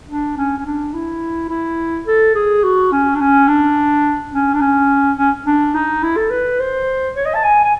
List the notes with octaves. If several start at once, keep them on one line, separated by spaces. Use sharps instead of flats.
D4
C#4
C#4
D4
E4
E4
A4
G#4
F#4
C#4
D4
C#4
D4
C#4
D4
C#4
C#4
D4
D#4
E4
A4
B4
C5
C#5
D#5
A5
G#5
G#5